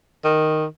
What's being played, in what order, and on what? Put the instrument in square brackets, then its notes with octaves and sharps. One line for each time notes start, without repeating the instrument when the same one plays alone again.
[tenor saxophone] D#3